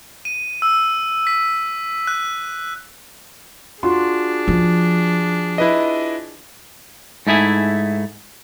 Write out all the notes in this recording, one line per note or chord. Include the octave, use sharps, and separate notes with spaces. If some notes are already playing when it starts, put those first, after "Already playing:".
D#7
E6
B6
F#6
D4 F4 F#4 G#4 C6
F3
E4 B4 D#5
G#2 A3 E4 G#4